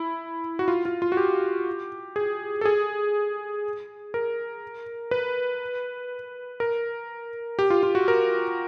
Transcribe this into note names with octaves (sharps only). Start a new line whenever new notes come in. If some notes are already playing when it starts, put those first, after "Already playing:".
Already playing: E4
F#4
F4
F4
F4
F#4
G4
G#4
A4
G#4
A#4
B4
A#4
G4
F4
F4
F#4
A#4